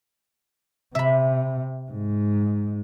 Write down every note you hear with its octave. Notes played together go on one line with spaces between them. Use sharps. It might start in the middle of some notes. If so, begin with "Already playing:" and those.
C3 E5 B5
G#2